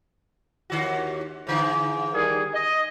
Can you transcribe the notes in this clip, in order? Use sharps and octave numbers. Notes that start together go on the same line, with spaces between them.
D#2 D#3 F#4
G#2 D3 E3
D#3 G3 G#4
D#5